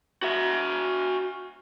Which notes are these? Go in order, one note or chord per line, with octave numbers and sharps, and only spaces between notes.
F#4 E5